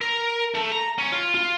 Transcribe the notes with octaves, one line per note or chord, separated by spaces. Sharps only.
A#4
A3
A#5
D#2 C#4
F4
F4